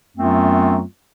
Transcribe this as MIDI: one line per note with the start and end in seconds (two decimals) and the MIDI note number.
0.17 0.82 42
0.17 0.82 54
0.17 0.82 57
0.17 0.82 59
0.17 0.82 60
0.17 0.82 65